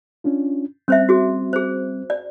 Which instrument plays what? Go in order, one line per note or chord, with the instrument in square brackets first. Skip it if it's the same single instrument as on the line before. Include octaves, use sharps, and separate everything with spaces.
[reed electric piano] C#4 D4 F4
[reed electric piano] G3 C4 [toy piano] C#4 C5 E5
[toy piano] F#4 G#4
G#4 C5
D5